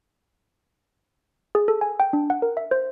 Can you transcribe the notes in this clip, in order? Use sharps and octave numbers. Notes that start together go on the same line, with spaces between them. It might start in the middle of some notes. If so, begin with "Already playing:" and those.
G#4
A4
G#5
G5
D4
F#5
A#4
E5
C5